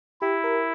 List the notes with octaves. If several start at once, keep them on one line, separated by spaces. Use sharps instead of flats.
E4 G4
A#4